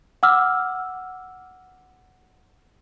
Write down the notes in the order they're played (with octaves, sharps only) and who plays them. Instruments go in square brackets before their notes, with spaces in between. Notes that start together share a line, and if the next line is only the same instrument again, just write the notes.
[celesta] F#5 D6 E6 F6